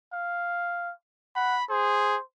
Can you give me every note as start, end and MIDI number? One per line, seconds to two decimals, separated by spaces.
0.13 0.92 77
1.36 1.57 78
1.36 1.64 83
1.70 2.17 68
1.70 2.22 72